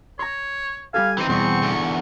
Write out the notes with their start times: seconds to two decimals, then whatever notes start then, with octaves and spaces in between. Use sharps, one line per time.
0.19 C#5 A#5 C6
0.94 G3 G4 A4 F5 G#5
1.18 E3 C4 D#4
1.29 E2 B2 G3 G#4 C#6
1.63 E2 D3